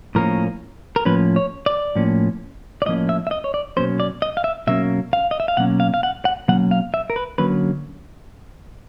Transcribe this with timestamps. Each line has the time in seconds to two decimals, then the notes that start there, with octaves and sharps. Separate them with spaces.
0.15 A2 F3 A#3 C#4 A#4
0.96 A#4
1.05 A2 F3 A#3 C#4 B4
1.36 C#5
1.66 D5
1.96 A2 F3 A#3 C#4
2.82 D5
2.86 A2 F3 A#3 C#4 D#5
3.09 E5
3.27 E5
3.31 D#5
3.44 C#5
3.54 D5
3.77 B2 F#3 A#3 C#4 C5
4.00 D5
4.22 D#5
4.37 F5
4.44 E5
4.67 B2 F#3 A#3 C#4 E5
5.13 F5
5.31 D#5
5.40 E5
5.48 F5
5.57 B2 F#3 A#3 C#4 F#5
5.80 F5
5.94 F5
6.03 F#5
6.25 F#5
6.48 B2 F#3 A#3 C#4 F#5
6.71 F5
6.94 E5
7.10 A#4
7.16 B4
7.38 D3 F#3 A#3 C#4 B4